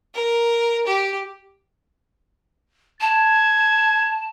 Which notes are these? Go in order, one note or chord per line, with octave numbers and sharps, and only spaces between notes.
A#4
G4
A5 G#6